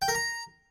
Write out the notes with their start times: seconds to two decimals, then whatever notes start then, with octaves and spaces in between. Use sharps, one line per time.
0.02 G5
0.08 A#4
0.15 A#5